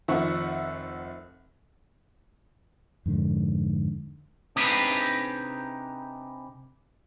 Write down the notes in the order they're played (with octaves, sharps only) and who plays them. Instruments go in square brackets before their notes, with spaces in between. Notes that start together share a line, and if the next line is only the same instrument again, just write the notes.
[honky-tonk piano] F1 D#3 F3 E5 F#5 C#6
[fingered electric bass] F2 G#2 D3
[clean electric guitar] C3 D4 D#4 G4 G#4 B4